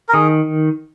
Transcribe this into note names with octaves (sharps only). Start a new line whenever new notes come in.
A#4
D#3 G#4